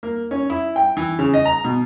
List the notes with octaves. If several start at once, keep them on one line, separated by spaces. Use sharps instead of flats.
A#3
C#4
E4
G5
E3
C#3
D#5
A#5
B2